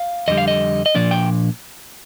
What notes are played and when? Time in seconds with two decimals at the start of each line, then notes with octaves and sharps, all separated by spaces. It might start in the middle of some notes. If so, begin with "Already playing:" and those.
Already playing: F5
0.28 F2 D3 G3 D#5
0.38 F5
0.48 D#5
0.86 D#5
0.95 A#2 F3 A#3 D4 D5
1.11 G5